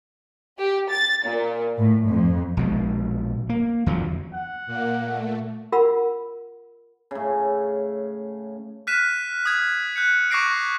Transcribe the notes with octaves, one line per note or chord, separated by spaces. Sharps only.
G4
A6
A#2
A2
F2
A#1 B2 G#3
A#3
E2 D3 F3 F#3
F#5
A#2 A#3
A3
F4 A#4 F#5 B5 E6
A2 C#3
F6 F#6 B6 D#7 E7
D#6 G#6
F#6 G6 C#7
C#6 D6 F#6 A#6 C7 D7